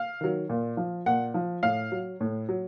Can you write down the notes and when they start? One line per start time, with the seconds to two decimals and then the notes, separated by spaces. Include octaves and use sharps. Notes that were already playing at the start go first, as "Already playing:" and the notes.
Already playing: F5
0.21 D#3 F#3
0.50 A#2
0.77 F3
1.06 A#2 F#5
1.34 F3
1.63 A2 F5
1.92 F#3
2.21 A2
2.49 F#3